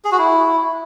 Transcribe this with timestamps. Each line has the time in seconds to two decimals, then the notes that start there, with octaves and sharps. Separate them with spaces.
0.05 G#4
0.12 F#4
0.19 E4